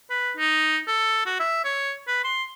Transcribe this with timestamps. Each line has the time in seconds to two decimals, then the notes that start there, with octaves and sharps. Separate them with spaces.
0.10 B4
0.37 D#4
0.87 A4
1.26 F#4
1.40 E5
1.65 C#5
2.08 B4
2.24 C6